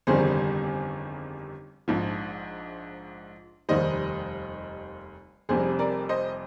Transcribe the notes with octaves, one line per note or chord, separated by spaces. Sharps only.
G1 F2 C3 D#3 G3 G#4 C5
A#1 G#2 F3
F1 D#2 D#3 G3 C5 D#5
F1 F2 C3 G3 G#4 C5
A#4 D5
C5 D#5